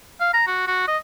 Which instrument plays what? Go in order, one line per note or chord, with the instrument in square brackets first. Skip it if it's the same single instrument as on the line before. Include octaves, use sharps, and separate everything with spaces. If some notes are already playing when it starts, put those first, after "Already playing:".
[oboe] F5
A#5
F#4
F#4
D#5